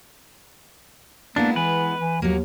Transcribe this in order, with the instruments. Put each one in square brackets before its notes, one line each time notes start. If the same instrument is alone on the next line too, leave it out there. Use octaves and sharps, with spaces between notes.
[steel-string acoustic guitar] G#3 B3 E4 [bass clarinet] A#3 [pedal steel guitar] D4
[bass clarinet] E3 [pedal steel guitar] B4
[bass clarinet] E3
[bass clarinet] D#2 [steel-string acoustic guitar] F#3 A#3